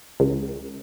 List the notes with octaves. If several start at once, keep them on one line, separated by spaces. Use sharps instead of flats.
C#2